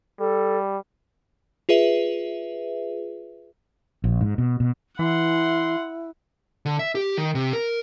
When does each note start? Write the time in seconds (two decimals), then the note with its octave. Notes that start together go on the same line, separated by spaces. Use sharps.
0.20 G3 A4
1.69 F4 G#4 B4 E5
4.04 A#1
4.21 G#2
4.38 B2
4.60 B2
4.99 E3 E4 F#5 C6
6.65 D3
6.79 E5
6.95 G4
7.18 D#3
7.35 C3
7.53 A#4